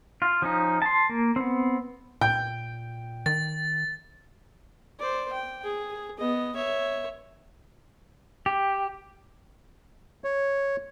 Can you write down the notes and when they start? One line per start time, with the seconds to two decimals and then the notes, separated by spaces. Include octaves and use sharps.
0.22 F4
0.42 F3 C#4 D#4
0.82 A5 C6
1.09 A#3
1.36 B3 C4
2.21 A#2 G5 G6
3.26 D#3 A6
4.99 C5 D5
5.33 G5
5.64 G#4
6.18 B3 D#5
6.56 C#5 E5
8.46 G4
10.24 C#5